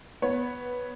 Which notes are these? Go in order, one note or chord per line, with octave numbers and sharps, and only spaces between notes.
B3 C#5